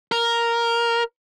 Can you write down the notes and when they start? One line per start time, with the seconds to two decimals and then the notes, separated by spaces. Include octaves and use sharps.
0.12 A#4